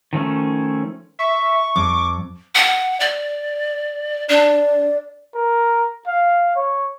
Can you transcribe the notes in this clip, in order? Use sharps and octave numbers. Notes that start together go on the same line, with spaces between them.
D#3 F3 A3 C#4
E5 C#6
F2 D6
F#5
D5
D4 D5
A#4
F5
C#5